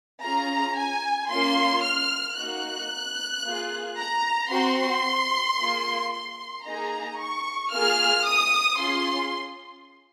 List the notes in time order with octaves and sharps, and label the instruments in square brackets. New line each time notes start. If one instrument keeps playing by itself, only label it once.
[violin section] C#4 F4 G#4 A#5
G#5
A#3 C#4 F4 C6
F6
A#3 D#4 F#4 F#6
A#3 F4 G#4
A#5
C4 F#4 C6
A#3 F4 G#4
C6
A#3 D#4 G#4 A#5
C#6
A#3 F4 G#4 F6
D#6
C#4 F4 G#4 C6